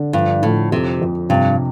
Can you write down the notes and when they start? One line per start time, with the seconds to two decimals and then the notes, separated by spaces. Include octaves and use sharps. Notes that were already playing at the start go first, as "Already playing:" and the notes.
Already playing: D3
0.13 G2 F3
0.42 A2 F3
0.72 F2 C3
1.01 F2
1.29 G2 C3